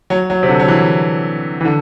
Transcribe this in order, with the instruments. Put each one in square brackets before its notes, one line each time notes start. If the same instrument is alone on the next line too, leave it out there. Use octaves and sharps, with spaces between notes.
[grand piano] F#3
F#3
C3
D3
F#3
E3
E3
D3